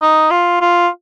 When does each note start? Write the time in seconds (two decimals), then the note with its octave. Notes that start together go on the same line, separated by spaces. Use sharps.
0.02 D#4
0.31 F4
0.61 F4